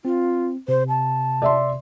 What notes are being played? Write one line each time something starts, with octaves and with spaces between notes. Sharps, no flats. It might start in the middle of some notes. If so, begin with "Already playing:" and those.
C4 F4
C3 C5
A5
D5 E5 C6